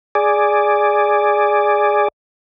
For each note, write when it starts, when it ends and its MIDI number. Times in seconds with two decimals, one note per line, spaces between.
0.15 2.08 68
0.15 2.08 74